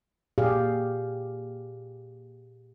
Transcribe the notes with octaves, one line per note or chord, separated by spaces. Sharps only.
A#2 G4 G#4 D5 F5